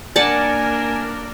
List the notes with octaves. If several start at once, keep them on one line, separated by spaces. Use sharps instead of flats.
A#3 D4 A#4 D5 F#5 G#5 A5